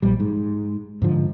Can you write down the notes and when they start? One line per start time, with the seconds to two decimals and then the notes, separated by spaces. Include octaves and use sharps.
0.02 A#1 G3
0.20 G#2
1.02 G#2 D3 F3